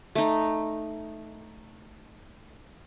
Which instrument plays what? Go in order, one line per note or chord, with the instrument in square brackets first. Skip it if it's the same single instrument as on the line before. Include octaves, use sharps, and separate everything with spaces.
[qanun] A3 D#4